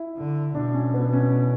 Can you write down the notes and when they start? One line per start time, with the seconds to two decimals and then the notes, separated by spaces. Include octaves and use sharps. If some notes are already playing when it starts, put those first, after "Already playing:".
Already playing: E4
0.17 D3
0.55 B2 D4
0.74 C#4
0.94 B3
1.13 C#4